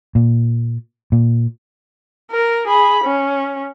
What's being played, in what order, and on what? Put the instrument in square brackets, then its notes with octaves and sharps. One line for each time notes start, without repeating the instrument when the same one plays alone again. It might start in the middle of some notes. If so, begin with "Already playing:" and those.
[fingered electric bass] A#2
A#2
[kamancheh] A#4
G#4 B5
C#4